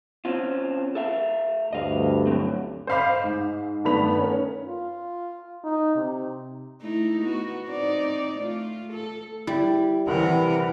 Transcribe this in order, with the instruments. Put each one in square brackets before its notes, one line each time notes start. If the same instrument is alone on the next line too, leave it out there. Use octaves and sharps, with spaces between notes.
[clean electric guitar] C4 C#4 F4
A4 E5 F5
[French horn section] D2 G2 [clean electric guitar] D#5 F5
[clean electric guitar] F#3 C4
[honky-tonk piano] C5 D#5 F5 B5 D6
G#2
G2 D#3 A3 B3 B5 F7
C#4 A#4
[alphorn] F4
D#4
C3
[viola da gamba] A3 D#4 E4
B3 F#4
C4 D#4 D5
A3 F4
A4
[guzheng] G3 [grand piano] E4
[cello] C3 A#4 [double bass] E3 [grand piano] F#5